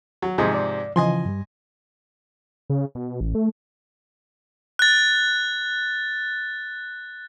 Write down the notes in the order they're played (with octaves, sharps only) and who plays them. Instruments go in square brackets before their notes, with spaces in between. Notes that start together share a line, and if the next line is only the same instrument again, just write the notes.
[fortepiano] F#3
[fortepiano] G#2 C3 F3 [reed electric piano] G#4 D#5 G#5
[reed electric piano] D5
[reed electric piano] C#3 E3 F3 [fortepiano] D#5 G#5 C6
[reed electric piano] G2 G3
[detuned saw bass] C#3
B2
A1
A3
[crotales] F#6 A6